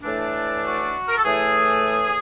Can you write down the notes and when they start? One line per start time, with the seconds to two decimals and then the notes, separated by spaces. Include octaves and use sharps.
0.03 A2 E3 A3 D4
0.64 F#4
1.08 A#4
1.18 A4
1.25 A2 E3 A3 G#4